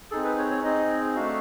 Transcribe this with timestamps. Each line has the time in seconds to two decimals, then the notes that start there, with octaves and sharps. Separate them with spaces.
0.11 C4 D#4 G#4 A4
0.24 B4
0.38 C#5
0.51 C#5
0.63 C4 D#4 G#4 D#5
1.16 A3 D4 F#4 F5